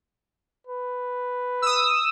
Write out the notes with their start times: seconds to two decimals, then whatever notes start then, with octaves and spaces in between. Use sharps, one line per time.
0.68 B4
1.62 D#6 E6